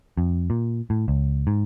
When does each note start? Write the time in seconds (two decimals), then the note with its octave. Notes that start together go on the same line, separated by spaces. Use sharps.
0.17 F2
0.50 A#2
0.90 A2
1.08 C#2
1.47 G#2